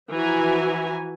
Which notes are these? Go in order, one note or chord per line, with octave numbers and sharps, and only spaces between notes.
E3 F3 F#4 E5 G#5 A#5